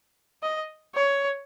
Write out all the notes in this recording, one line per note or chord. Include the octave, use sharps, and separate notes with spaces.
D#5
C#5